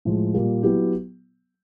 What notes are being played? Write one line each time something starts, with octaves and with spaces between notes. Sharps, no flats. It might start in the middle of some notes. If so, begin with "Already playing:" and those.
A2 F3 G#3
A#2 G3 A#3
F#3 B3 E4 G4